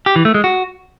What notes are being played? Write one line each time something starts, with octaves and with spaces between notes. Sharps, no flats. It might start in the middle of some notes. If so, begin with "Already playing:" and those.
G4
E3
A3
G#3
F#4